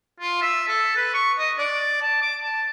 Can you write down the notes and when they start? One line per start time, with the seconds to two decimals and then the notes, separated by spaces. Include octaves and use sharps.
0.20 F4
0.42 E5
0.68 A4
0.96 B4
1.14 C#6
1.39 D#5
1.58 D5
2.01 A5
2.22 D6
2.44 A5